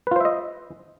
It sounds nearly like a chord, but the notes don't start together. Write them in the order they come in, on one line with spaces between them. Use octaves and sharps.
B4 F4 C5 E5 D#5